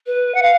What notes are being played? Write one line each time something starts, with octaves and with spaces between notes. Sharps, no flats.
B4
F#5
F5